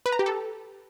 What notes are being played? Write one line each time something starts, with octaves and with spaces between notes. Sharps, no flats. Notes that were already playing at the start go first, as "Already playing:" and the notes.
B4
A#5
G4
A4